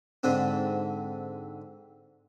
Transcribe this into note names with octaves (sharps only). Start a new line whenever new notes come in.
G#2 D3 C4 D4